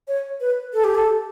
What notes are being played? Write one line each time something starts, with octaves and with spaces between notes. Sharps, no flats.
C#5
B4
A4
G4
A4